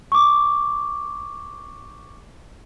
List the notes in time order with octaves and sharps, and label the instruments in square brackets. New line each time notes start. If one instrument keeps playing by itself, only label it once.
[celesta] C#6 D6